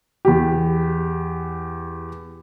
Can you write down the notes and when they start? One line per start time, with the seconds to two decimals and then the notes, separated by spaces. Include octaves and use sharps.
0.25 E2 G4